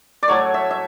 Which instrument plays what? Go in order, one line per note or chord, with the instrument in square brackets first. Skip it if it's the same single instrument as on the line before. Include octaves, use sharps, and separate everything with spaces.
[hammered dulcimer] D5
A2 F#3 A3 C#5
E5
E5